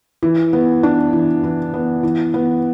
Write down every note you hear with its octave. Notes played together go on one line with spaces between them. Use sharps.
E3
B3
D4
E3
E3
B3
E3
B3